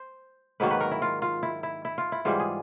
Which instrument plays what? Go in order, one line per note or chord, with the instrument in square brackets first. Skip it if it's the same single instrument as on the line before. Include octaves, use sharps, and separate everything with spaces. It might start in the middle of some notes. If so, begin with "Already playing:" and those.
Already playing: [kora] C5
G#2 D#3 F#3 A#3 B4
B4
A#4
E4
F4
F4
E4
E4
E4
F4
E4
G#2 E3 G3 F4
G#4